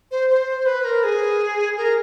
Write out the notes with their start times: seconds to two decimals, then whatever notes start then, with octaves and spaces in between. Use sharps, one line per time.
0.11 C5
0.30 C5
0.66 B4
0.85 A#4
1.04 G#4
1.77 A#4